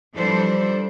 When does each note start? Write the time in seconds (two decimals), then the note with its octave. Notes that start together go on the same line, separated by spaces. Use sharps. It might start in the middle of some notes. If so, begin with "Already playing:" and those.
0.15 E3 F3 G3 D4 A4 C5